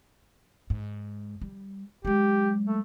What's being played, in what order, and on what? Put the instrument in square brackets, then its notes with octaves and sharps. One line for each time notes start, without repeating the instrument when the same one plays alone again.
[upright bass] G#2
G3
[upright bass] F#3 G#3 [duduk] G4
[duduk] A3